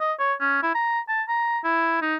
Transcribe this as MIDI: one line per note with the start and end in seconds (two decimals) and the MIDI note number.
0.01 0.13 75
0.19 0.34 73
0.41 0.61 61
0.63 0.71 64
0.75 1.00 82
1.08 1.23 81
1.29 1.59 82
1.64 1.98 64
2.02 2.16 63